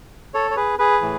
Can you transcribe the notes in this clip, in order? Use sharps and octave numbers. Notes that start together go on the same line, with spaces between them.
A4 C#5
C#5
G#4 B4
G#4 B4
A2 E3